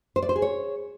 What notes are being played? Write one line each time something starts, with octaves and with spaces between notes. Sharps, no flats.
C5
D5
C5
G#4
C#5